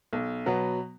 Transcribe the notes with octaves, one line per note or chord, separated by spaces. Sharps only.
B1
B2 F#3 B3